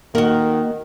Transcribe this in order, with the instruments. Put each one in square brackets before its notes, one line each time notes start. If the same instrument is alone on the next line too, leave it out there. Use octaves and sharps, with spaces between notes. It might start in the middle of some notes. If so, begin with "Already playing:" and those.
[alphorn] D#3 [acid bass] A#3 [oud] F#4 A#4